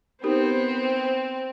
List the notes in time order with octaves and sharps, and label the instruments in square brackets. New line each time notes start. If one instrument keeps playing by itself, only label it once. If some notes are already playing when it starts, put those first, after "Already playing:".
[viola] B3 C5 [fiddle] C4 [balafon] D#4 G4 A#4